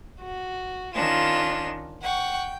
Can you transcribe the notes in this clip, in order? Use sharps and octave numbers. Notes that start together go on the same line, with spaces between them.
F#4
D#3 C#4 D4 F4 E7
F#5 G5 C#6